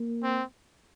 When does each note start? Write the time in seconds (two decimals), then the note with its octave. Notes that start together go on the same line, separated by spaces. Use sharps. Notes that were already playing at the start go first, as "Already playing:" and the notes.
Already playing: A#3
0.23 C4